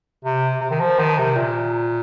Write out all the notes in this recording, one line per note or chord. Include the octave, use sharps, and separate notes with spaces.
C3
C3
D#3
F3
D#3
C3
A#2